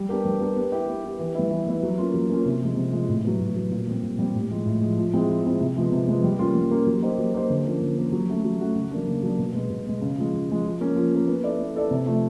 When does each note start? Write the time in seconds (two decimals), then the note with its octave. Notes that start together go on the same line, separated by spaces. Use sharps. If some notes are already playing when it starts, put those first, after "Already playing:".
Already playing: G3
0.09 B3 D4 G4 A#4
0.25 G3
0.40 B3 D4 G4 A#4
0.56 B3
0.72 E4 G4
0.88 B3
1.04 E4 G4
1.19 E3
1.35 G3 B3 E4
1.50 E3
1.66 G3 B3 E4
1.83 F#3
1.98 A#3 C#4 F4
2.14 F#3
2.30 A#3 C#4 F4
2.46 C3
2.61 F3 G#3
2.76 C3
2.92 F3 G#3
3.08 A2
3.24 F#3 B3
3.40 A2
3.56 F#3 B3
3.72 A#2
3.87 G3 C4
4.03 A#2
4.19 G3 C4
4.35 A2
4.50 F3 G#3
4.66 A2
4.82 F3 G#3
4.97 F3
5.13 G#3 C4 E4 G#4
5.29 F3
5.45 G#3 C4 E4 G#4
5.61 C3
5.76 F3 G#3 B3
5.92 C3
6.07 F3 G#3 B3
6.24 G3
6.39 A#3 C#4 F4
6.55 G3
6.71 A#3 C#4 F4
6.87 F#3
7.02 A#3 D#4 G4 C5
7.18 F#3
7.34 A#3 D#4 G4 C5
7.50 D3
7.65 F3 A#3 C#4
7.81 D3
7.97 F3 A#3 C#4
8.12 F#3
8.29 A3 C#4 F#4
8.44 F#3
8.60 A3 C#4 F#4
8.76 C#3
8.91 F#3 A#3 D4
9.07 C#3
9.23 F#3 A#3 D4
9.39 B2
9.55 G#3 B3
9.70 B2
9.86 G#3 B3
10.01 C#3
10.17 F3 G#3
10.34 C#3
10.49 F3 G#3
10.65 F3
10.81 A#3 C#4
10.96 F3
11.12 A#3 C#4
11.28 B3
11.44 E4 A4 D5
11.59 B3
11.75 E4 A4 D5
11.91 C3
12.06 F3 A3